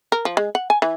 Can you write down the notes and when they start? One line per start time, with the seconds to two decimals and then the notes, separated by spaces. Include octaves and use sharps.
0.12 A#4
0.25 F3
0.37 G#3
0.55 F#5
0.70 G#5
0.82 E3